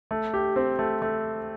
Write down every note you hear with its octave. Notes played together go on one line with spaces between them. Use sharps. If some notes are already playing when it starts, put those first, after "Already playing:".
A3
G4
C4
A3
A3